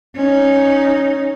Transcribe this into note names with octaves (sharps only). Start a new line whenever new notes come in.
C#4 D#4